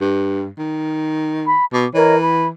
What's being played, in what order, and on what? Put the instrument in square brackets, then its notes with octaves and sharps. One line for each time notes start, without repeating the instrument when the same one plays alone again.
[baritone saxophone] G2
D#3
[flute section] B5
[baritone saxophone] B2 [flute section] D6
[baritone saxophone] E3 [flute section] A#4 C#5 D#5
[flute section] B5